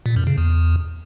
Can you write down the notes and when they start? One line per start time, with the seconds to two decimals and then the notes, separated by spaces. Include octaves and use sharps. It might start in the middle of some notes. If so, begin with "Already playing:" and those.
0.06 A#2
0.16 F#2
0.27 C#3
0.38 E2